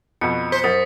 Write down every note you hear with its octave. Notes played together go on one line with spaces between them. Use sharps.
F2 B2 C#7
C5 B6
F#2 D#6 A6